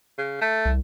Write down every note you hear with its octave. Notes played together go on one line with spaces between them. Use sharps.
C#3
A3
C2